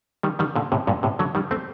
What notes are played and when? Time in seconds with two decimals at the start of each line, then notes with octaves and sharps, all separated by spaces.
0.23 D#3 G3
0.39 D#3 G3
0.56 A#2 D3
0.72 A2 C3
0.87 G2 A#2
1.03 A2 C3
1.19 D3 F#3
1.35 D#3 G3
1.51 A3 C4